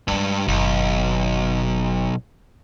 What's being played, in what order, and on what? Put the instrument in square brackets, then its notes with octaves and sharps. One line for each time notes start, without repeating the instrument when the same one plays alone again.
[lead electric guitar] G2 [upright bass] G#3 A#3
[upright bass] F#1 D#3 [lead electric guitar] B1